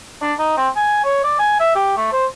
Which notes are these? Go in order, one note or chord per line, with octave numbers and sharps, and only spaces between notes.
D4
D#4
C4
G#5
C#5
D5
G#5
E5
G4
A3
C5